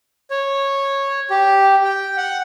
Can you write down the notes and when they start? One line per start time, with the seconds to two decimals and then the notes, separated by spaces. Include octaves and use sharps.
0.31 C#5
1.30 G4
1.84 G5
2.17 F#5